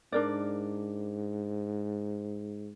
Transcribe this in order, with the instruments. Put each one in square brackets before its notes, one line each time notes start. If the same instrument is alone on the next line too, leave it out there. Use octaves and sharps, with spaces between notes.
[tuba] G#2 [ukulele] D4 A#4 D5